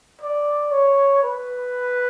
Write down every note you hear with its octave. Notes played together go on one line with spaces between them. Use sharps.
D5
C#5
B4